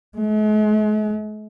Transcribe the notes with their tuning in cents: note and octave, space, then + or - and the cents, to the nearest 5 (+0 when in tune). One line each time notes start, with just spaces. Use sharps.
G#3 +45